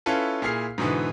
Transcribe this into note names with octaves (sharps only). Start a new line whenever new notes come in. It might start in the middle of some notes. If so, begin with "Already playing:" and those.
C#4 E4 F4 A4 B4
A#2 E4 G#4 F6 C7
G#2 B2 D3 E3 B3